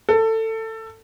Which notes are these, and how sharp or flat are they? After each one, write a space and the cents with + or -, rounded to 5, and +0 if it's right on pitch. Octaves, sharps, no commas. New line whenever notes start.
A4 +20